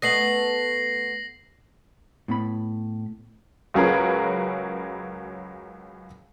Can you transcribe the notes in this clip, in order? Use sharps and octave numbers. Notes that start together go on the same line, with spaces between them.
A3 B3 D#5 A#6 C7 F#7
A2 B3 B5
C#2 F#3 C#4 G#4 A#4 B4